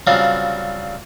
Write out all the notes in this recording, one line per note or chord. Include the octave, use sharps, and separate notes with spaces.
C#3 F#3 G3 C4 D4 F4